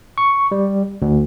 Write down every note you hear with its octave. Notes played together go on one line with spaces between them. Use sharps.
C#6
G3
D2